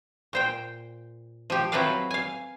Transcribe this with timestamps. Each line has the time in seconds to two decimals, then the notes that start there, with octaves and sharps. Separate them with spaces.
0.33 A#2 C5 G5
1.50 F3 G4
1.72 F#3 C4 E4 A4 B4 F5
2.11 F5 G#5